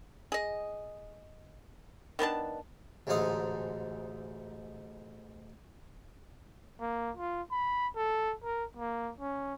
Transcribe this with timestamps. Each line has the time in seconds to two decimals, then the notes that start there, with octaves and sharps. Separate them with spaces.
0.32 G#4 D#5
2.19 D#3 B3 D4 A5
3.07 A1 D2 G#2 D#4 F5 D#6
6.80 A#3
7.17 F4
7.51 B5
7.96 A4
8.43 A#4
8.77 A#3
9.20 C#4